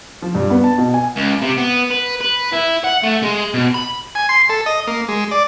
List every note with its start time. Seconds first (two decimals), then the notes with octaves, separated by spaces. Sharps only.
0.22 F3
0.35 G2
0.50 B3
0.64 A5
0.78 B2
0.94 G#5
1.16 C#2
1.42 C3
1.58 B3
1.91 B4
2.21 B4
2.53 E4
2.84 F#5
3.04 A3
3.23 G#3
3.54 B2
3.74 B5
4.15 G#5
4.29 C6
4.50 A4
4.66 D#5
4.87 A#3
5.09 G#3
5.31 D5